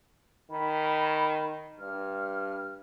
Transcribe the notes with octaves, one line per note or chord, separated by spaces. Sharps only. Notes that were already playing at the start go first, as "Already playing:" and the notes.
D#3 B5
G2 F6